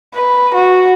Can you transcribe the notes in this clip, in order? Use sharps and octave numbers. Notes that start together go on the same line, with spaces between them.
B4
F#4